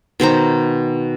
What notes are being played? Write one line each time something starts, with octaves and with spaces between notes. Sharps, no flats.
B2 D#3 C5 A#5